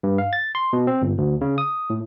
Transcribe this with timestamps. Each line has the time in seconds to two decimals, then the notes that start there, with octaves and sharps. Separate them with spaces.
0.03 G2
0.18 F5
0.33 A6
0.55 C6
0.73 B2
0.87 C4
1.02 G1
1.18 D2
1.41 C#3
1.58 D#6
1.90 A2